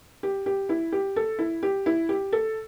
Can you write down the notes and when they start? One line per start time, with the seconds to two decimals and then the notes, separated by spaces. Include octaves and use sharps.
0.23 G4
0.46 G4
0.69 E4
0.92 G4
1.16 A4
1.39 E4
1.63 G4
1.86 E4
2.09 G4
2.33 A4